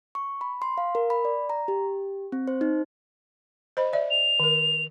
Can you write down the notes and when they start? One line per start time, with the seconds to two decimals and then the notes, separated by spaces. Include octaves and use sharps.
0.15 C#6
0.41 B5
0.62 C6
0.78 F5
0.95 A#4
1.10 B5
1.25 D5
1.50 A#5
1.68 G4
2.32 C4
2.48 C5
2.61 D#4
3.77 C5 D#5 B5
3.93 D5 E5
4.10 F7
4.40 D#3 A#4